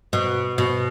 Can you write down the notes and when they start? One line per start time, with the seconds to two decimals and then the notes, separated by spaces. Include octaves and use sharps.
0.13 B2
0.58 B2